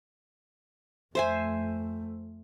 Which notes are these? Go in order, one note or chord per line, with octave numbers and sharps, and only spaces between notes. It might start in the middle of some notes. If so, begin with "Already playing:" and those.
F2 A3 C5 E5 G#5